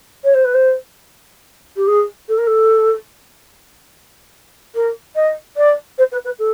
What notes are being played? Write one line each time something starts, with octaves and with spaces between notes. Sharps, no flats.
C#5
C5
B4
C5
G4
G#4
A4
A#4
A4
A#4
D#5
D5
C5
B4
B4
A4